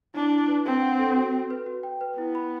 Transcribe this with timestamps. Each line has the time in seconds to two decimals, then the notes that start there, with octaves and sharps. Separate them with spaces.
0.14 D4 E4
0.31 E4
0.48 B4
0.65 C4 D4
0.82 F#5
0.99 A4
1.15 F#4
1.33 F#4
1.50 B4
1.66 F#4
1.83 G5
2.01 B4
2.17 B3 E4
2.35 B5